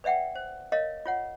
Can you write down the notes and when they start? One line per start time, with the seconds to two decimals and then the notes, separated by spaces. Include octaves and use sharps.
0.04 B4 D5 E5 F#5 G5
0.35 C5
0.72 A#4 C#5 D#5 F5
1.06 F4 C#5 F#5